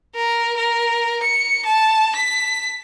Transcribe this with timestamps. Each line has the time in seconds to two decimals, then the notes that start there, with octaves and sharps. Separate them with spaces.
0.16 A#4
0.57 A#4
1.23 C#7
1.66 A5
2.16 B6